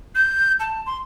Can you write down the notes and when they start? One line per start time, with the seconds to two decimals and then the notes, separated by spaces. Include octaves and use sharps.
0.15 G6
0.60 A5
0.86 C6